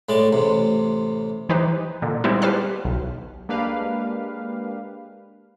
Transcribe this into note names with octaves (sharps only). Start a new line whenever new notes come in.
A2 G#3 D5
A1 C3
E3 D#4 G4 B4 C5
A#2 D3
G3 G#3 B3 C4 D#4 E4
G4 B4 C5 F5 A5 F6
B1
G#3 A#3 D4 G4 B4 F5